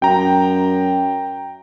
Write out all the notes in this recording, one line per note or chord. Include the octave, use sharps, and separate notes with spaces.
F#2 G5 A#5